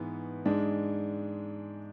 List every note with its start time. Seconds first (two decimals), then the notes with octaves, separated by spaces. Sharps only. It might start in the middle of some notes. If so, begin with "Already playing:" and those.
Already playing: G#2 E3 G#3 B3
0.46 G#2 G#3 D4